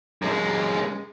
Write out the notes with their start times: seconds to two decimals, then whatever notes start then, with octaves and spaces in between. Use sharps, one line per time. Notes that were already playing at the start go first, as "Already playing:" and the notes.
0.22 F#2 G#3